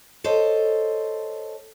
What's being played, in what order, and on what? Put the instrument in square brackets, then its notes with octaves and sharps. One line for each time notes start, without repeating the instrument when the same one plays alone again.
[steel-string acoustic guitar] A4 C5 C#5 D#5